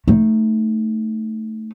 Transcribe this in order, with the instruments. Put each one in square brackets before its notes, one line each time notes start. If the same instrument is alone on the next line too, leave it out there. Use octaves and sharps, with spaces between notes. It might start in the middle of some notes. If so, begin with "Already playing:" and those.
[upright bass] A3 D#4